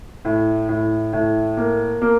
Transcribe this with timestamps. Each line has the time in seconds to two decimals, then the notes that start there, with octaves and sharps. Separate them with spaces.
0.25 A2
0.69 A2
1.13 A2
1.57 A#3
2.02 A#3